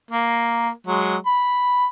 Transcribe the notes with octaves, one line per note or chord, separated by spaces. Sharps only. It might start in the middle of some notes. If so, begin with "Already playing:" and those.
A#3
F#3 G#3
B5